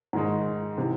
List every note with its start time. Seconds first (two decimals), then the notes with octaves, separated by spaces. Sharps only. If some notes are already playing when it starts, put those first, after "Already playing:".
0.13 G#2 D#3 G#3 D#4
0.78 C3 E3